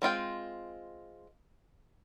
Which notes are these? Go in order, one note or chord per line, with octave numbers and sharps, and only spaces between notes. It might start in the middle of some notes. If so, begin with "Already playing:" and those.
G#3 C4 F4 G5